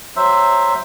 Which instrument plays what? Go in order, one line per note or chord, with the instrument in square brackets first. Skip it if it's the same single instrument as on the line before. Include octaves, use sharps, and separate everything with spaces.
[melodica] F#3 C5 E5